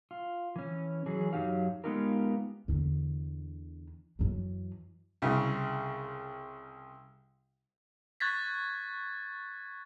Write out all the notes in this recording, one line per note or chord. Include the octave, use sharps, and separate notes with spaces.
F4
E3 C#4
E3 F#3 G#4
F#2 F#3 D#4 G4 F5
G#3 B3 D#4 F4 G4 A#4
E2 D3
F#2 E3
C2 C#3
C#6 F#6 G#6 A6 B6